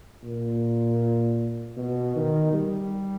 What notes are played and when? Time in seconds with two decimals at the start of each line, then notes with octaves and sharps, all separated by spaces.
0.23 A#2
1.77 B2
2.16 D#3
2.53 G3